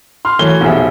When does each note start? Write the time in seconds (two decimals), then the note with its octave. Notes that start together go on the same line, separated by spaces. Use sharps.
0.25 C6 F6
0.39 E3 F#3 A3 C#5 G7
0.61 F1 B1 F3 G#4 E5